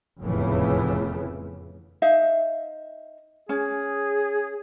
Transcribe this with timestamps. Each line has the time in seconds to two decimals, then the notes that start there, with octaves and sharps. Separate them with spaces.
0.20 F1 E2 A2 C#3 E3
2.02 D#4 E5 F5
3.49 C#4 G#4